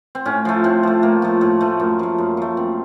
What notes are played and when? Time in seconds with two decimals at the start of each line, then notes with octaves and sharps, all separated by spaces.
0.15 C4
0.25 A2 C#4
0.45 F3 A3
0.64 A2 C4
0.83 F3 A3
1.02 A2 A#3
1.22 F3 A3
1.41 A2 A3
1.61 F3 A3
1.80 F#2 A#3
1.99 F3 A3
2.18 F#2
2.37 F3 A3
2.57 F#2 C4